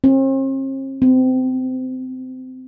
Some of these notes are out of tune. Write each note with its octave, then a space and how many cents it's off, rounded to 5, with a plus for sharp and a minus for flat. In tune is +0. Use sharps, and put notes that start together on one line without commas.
C4 +45
C4 -25